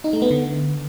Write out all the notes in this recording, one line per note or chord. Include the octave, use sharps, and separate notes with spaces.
D#4
A3
B3
D3